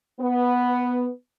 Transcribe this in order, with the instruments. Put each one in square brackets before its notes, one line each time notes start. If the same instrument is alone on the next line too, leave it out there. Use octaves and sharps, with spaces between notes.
[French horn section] B3